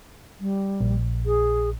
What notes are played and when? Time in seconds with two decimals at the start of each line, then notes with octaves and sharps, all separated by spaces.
0.40 G3
0.81 A#1
1.26 G#4